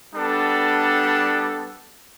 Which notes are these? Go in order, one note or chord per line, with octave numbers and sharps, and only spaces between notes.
G3 B3 D4 A4